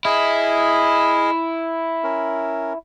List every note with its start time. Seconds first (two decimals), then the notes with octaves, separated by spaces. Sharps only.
0.05 E4 G#4 D#5 F6
2.04 C#4 A#4